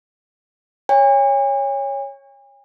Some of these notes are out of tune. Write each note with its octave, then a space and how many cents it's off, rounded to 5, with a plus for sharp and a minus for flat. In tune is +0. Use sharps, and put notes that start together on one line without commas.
C#5 +0 G#5 -40